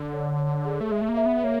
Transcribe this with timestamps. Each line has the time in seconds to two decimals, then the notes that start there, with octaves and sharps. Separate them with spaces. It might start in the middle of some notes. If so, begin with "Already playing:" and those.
Already playing: D3
0.13 C#5
0.39 C#5
0.65 G#4
0.81 A3
0.91 G#3 E5
1.01 A3
1.09 A#3
1.17 E5
1.26 B3
1.44 A#3 C#5